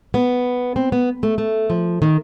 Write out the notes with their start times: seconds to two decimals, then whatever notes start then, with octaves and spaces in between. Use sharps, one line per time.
0.14 B3
0.76 C4
0.92 B3
1.23 A3
1.38 A3
1.70 F3
2.02 D#3